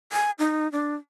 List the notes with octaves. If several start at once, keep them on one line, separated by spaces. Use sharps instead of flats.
G#5
D#4
D4